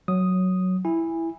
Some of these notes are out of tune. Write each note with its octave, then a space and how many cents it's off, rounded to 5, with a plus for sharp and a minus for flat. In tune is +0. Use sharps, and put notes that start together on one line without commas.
F#3 +0 D#6 +0
E4 +0 G#5 -25